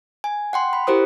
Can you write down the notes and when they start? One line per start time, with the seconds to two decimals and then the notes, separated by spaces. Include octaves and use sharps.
0.24 G#5
0.53 F#5 G5 C6
0.73 B5
0.87 E4 G4 A#4 C5 D#6